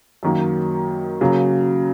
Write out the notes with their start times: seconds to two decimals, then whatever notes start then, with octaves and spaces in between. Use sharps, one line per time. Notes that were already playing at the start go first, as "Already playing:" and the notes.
0.23 F#2 D#3 F#3 A#3
1.21 C#3 F#3 A#3